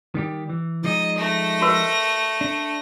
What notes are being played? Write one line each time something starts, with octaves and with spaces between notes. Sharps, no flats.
D#3 G3 G4
E3
F3 G#3 D#4 D#5
A3 A#6
F#4 A#4 B4
D4